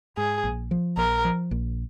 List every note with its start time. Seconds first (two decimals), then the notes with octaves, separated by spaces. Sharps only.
0.17 G#2 G#4
0.44 A#1
0.71 F3
0.97 A#1 A#4
1.25 F3
1.51 A#1